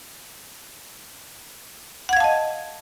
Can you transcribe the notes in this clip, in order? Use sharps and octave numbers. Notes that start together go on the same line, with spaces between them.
D#5 F5 F#5 A5 G#6